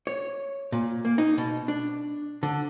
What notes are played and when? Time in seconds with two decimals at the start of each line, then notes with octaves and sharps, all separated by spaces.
0.07 C#5
0.72 A#2
1.05 A#3
1.18 D#4
1.38 B2
1.68 D4
2.43 D3